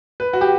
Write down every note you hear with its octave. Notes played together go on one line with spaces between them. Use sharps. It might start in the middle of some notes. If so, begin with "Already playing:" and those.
B4
F#4
G4